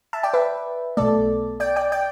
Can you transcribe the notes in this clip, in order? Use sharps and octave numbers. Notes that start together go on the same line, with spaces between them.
E5 A5
D5 G5
B4 E5
B1 B2 A3 A4 D5
D5 G5
D5 G5
D5 G5